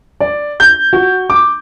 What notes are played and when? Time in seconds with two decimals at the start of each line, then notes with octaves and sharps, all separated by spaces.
0.20 D5
0.60 G6
0.93 F#4
1.30 D6